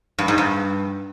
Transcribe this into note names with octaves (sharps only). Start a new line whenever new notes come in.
G2
G#2
G2